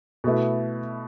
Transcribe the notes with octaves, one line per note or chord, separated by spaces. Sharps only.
B2 A3 E4 B4